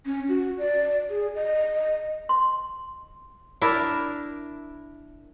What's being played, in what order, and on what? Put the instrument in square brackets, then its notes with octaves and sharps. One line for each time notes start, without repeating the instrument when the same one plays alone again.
[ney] C#4
F#4
D5
G#4
D#5
D#5
[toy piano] C6
[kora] D4 E4 A#4